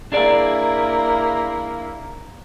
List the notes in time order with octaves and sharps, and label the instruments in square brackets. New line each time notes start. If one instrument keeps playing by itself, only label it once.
[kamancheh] A#3 E4 [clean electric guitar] D4 G#4 D5